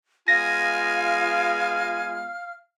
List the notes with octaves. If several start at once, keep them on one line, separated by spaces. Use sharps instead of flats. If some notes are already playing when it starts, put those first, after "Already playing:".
G#3 B3 F4 F5 G#5 F6 A#6